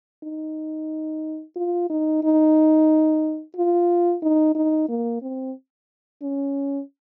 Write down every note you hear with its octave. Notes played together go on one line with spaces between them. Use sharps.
D#4
F4
D#4
D#4
F4
D#4
D#4
A#3
C4
C#4